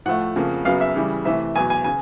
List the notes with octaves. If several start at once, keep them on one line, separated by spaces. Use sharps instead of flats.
A2 F3 A3 F#5
F2 C#3 F3 A#3
F#2 C#3 F#3 B3 F5
E5
C#3 E3 G3
C3 E3 A3 E5
E2 B2 F#3 G#5
G#5
C#3 G#5